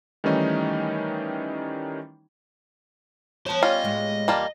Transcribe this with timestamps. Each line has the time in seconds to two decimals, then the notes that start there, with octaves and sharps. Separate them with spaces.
0.24 D#3 E3 G3 A3 C#4 D#4
3.46 B3 C5 C#5 A5
3.63 G3 C#4 F4 D#5
3.84 A2 G#3 B3
4.28 E2 G3 A#3 F4 A5